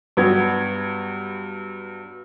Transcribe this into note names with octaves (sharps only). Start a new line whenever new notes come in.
G2 F#3 B3 G4 G#6